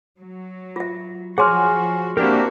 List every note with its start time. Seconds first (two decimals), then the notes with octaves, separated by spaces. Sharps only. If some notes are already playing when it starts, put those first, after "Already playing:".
0.19 F#3
0.76 F4 E5
1.38 F3 F#4 G#4 C#5 F#5 G#5 C6 F6
2.17 A#3 C4 D4 E4 F#4 G4 A#4